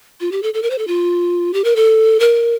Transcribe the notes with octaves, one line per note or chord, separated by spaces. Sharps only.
F4
G4
A4
A4
A#4
C5
A4
F4
G4
A#4
A4
A#4